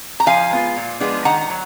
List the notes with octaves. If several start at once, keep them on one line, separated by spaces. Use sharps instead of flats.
A#5
F3 F5 G#5
G#3 B3 F4
A#2
F3 G#3 B3 D4
D#3 F#5 A#5
F#3